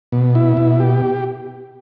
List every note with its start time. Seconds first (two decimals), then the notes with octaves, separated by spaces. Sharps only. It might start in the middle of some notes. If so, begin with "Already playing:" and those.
0.12 B2
0.35 E4
0.57 B2
0.80 G4